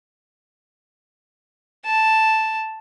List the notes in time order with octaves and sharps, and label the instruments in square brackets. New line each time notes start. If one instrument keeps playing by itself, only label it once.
[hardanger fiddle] A5